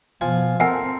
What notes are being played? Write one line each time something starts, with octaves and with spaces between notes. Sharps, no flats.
B2 F3 F4 G#5
C4 A4 A#4 F#5 G#5